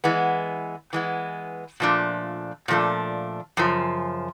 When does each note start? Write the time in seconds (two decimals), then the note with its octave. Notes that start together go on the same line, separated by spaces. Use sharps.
0.04 E3 G#3 B3
0.93 E3 G#3 B3
1.80 A#2 F3 A3 D4
2.68 A#2 F3 A3 D4
3.57 F#2 C#3 F3